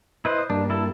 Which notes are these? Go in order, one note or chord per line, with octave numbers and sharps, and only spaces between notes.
E4 B4 C5 D#5
G2 A#3 D4
E4 A4